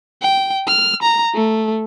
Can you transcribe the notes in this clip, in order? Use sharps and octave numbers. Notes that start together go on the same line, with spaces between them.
G5
F6
A#5
A3